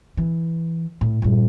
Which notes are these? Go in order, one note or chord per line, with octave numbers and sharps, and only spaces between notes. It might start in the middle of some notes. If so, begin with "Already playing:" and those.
E3
A2
A#1 G2